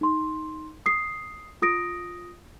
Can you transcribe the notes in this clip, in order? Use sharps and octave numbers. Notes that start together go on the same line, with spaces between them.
D#4 C6
D#6 C7
F4 D#6 A#6 D7